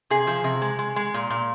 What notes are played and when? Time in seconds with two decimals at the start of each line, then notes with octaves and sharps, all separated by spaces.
0.10 C3 G#4
0.27 F3
0.44 C3
0.62 G#3
0.79 G#3
0.96 G#3
1.14 A#2
1.30 A#2